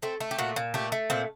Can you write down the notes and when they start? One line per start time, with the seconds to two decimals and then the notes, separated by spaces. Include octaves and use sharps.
0.02 A3 C4
0.20 A3
0.31 G4
0.39 A#2 F#4
0.56 A#2
0.74 A3 G4
0.92 A3
1.10 A#2 C4